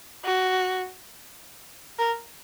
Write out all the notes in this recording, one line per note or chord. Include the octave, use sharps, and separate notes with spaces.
F#4
A#4